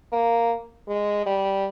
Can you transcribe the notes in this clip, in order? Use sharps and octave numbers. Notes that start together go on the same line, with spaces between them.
A#3
G#3
G3